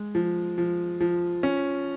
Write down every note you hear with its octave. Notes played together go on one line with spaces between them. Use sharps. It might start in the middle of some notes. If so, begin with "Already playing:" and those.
Already playing: G#3
F3
F3
F3
C#4